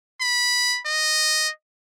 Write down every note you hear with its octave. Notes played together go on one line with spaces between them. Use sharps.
B5
D#5